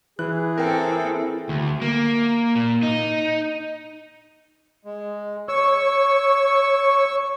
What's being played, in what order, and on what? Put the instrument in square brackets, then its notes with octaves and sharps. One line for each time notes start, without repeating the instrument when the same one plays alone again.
[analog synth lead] E3 [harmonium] G#4 [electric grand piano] F#6
[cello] C4 A4 [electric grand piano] A#4 G5
[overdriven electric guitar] D2
A#3
A#2
D#4
[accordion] G#3
[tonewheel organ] C#5 [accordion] C#6 E6